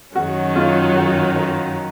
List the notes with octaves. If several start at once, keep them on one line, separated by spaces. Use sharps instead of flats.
F#2 D#3 F#3 C#4 F#4
F4
F#4
A#4